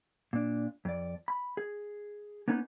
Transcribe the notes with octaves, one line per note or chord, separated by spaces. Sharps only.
A#2 D4
F2 D5
B5
G#4
A#3 B3 C#4 D#4 G#4 B4